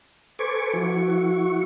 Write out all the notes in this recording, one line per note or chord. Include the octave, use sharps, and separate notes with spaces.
A4 B4 C5 G#5 C#6 D6
F3 E4 F#4 C#6